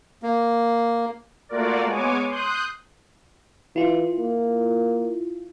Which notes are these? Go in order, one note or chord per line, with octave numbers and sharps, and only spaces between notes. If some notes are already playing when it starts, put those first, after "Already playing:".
A#3
A3 A#3 F4 F#4 A#4 D5
G#3 B3 C#5 G#5 D6
C6 D#6 F#6 G6
E3 E4 F4
A#3